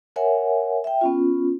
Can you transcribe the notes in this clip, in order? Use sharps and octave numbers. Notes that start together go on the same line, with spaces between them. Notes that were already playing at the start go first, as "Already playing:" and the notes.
A#4 C#5 E5 F#5 G#5
E5 G5
B3 C#4 F4